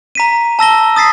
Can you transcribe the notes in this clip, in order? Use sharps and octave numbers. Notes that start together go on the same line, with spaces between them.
A#5 B6 D#7
A5 E6 A#6 G7
D#6 A6 B6 C7